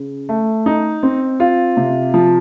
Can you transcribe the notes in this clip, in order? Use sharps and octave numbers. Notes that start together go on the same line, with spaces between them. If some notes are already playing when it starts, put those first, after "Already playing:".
Already playing: C#3
A3
D#4
C4
F4
C3
F3